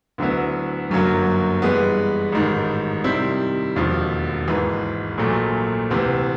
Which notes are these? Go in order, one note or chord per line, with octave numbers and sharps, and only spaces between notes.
D2 D3 F#3 B3 E4
G1 F#2 D3 F#3 A#3
G2 E3 G#3 B3
A1 G#2 D#3
C3 D#3 G3 C4 E4
E1 D#2 D3 F3
G#1 G#2 E3
A#1 A#2 F#3 A3
D2 C3 E3